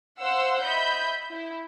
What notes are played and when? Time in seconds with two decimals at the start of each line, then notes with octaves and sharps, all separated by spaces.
0.20 C5 F5 F#5 C6 E6
0.64 D#5 E5 B5 G6
1.32 E4